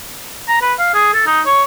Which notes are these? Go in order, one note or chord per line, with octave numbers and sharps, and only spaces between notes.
A#5
B4
F5
G#4
A4
D#4
C#5